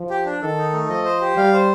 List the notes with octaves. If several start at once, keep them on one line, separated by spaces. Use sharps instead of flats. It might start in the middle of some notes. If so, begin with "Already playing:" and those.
Already playing: F3
G4
D4
D#3 A4
D#4
A3
F3 D#5
C5
G4
G3 F5
C5